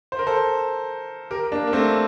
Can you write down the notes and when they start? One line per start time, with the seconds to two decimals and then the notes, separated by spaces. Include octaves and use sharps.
0.12 C5
0.19 A#4
0.27 A4 C5
1.31 G4 A#4
1.52 A#3 D4
1.67 A#3
1.73 A3 C4